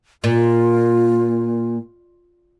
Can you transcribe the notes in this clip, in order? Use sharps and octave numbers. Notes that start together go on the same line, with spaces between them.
A#2 F4